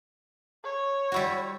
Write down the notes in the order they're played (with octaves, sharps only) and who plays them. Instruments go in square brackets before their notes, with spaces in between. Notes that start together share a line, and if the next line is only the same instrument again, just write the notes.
[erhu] C#5
[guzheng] G3 E4 F#4